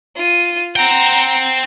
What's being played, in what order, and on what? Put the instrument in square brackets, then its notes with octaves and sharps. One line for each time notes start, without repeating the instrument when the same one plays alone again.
[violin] F4 D#7
[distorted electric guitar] C5 G5 [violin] F#5 A#5